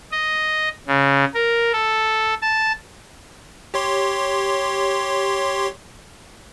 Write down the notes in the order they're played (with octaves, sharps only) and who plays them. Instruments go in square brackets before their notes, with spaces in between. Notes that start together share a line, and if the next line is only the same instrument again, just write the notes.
[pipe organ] D#5
C#3
A#4
A4
A5
[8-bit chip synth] G4 C#5 C6